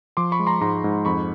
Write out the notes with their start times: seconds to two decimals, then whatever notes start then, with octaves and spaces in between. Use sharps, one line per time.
0.17 F3 C6 D6
0.32 B5 C#6
0.39 G#3
0.47 A#5 C6
0.61 G#2 A#5 C6
0.84 G#2
1.05 F2 B5 C#6